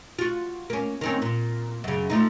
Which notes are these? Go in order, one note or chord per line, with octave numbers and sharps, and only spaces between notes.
F4 F#4
A#3 C#4
D#3 C4 C#4
A#2
F#2 C#3
F3 A3 D#4